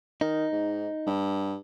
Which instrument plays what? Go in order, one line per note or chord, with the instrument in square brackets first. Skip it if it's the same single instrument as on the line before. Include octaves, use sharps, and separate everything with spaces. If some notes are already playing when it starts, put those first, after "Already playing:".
[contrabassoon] D#3 [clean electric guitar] D#4
[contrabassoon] G#2
G2